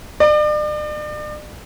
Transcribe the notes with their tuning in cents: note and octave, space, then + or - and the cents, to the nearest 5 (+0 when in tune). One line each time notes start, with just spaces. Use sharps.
D5 +40